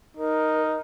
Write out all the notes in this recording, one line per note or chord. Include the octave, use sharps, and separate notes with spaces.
D#4 A#4